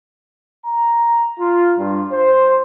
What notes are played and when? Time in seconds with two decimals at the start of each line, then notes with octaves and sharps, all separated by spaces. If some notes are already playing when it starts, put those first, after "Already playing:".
0.66 A#5
1.40 F4
1.77 G2
2.12 C5